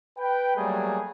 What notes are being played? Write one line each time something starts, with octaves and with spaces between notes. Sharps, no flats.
B4 G5
F#3 G3 A3 A#3 G#4